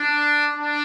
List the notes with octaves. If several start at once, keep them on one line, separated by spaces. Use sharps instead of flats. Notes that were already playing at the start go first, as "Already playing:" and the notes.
Already playing: D4
D4